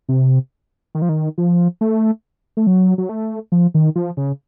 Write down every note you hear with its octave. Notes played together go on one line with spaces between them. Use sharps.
C3
D#3
F3
D#3
F3
A3
A3
F#3
F#3
A3
F3
D#3
F3
C#3